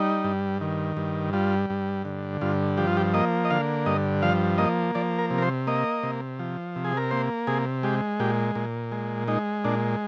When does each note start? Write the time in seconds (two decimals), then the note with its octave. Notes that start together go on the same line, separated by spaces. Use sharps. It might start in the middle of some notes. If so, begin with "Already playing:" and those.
Already playing: G3 D#4
0.24 G2
0.61 D#3
0.97 G2
1.33 G3 F4
1.70 G2
2.05 D3
2.41 G2 F4
2.77 F3 G4
2.87 F4
2.97 G4
3.14 A#3 D#5
3.45 D#5
3.51 D3 F5
3.86 G2 D#5
4.22 F3 F5
4.58 A#3 D#5
4.95 F3 D5
5.19 A#4
5.30 C3
5.38 A#4
5.42 C5
5.67 A#3 D#5
6.03 C3
6.39 F3
6.76 C3
6.85 G#4
6.97 A#4
7.11 A#3 C5
7.47 C3 G#4
7.83 G#3 G4
8.20 A#2 G4
8.55 A#2
8.92 G#3
9.28 G#3 D#4
9.64 A#2 D4